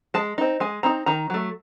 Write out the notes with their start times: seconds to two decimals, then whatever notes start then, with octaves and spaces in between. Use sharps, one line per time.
0.14 G#3 A5
0.38 C4 D#4
0.60 G#3 G#5
0.83 C4 D#4 A#5
1.06 D#3 A#5
1.30 F#3 A3